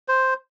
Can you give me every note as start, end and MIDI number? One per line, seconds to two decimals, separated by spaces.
0.08 0.34 72